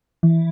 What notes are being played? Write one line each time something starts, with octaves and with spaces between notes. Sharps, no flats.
E3